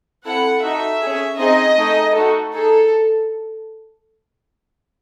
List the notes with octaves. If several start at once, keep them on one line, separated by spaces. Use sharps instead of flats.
C4 E4 A4 F#5
D#4 F#4 A4 E5
C#4 G#4
C4 D#4 G#4 D#5
A3 D#4 G#4
A3 D#4 F#4 A4
D#4 G#4 A4